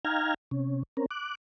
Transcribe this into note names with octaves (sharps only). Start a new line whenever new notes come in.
D#4 F5 G5 A#5 F6 G#6
C3 C#4
C4 C#4 A#4
D6 F#6